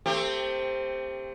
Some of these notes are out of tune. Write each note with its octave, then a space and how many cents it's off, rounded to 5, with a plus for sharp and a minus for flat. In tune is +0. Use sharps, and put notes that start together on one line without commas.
A3 +35 C4 +0 G4 +20